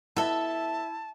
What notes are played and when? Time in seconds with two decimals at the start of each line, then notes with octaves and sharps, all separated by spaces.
0.17 B2 E4 A4 E5 A5